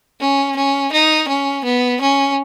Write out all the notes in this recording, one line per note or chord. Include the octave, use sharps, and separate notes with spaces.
C#4
C#4
D#4
C#4
B3
C#4